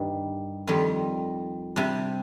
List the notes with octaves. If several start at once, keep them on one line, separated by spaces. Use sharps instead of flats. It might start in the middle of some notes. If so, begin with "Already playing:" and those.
Already playing: G2 D#3 G3
F2 D#3 G3
C3 G3 D4